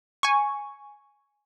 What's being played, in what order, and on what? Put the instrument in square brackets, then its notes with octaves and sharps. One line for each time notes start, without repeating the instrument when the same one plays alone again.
[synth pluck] G#5 C#6